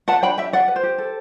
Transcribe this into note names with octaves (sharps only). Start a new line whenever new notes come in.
B4 F#5 A5
D4 G5 B5
G4 E5 G5
G4 D5 F#5
B4
C5
G4
A4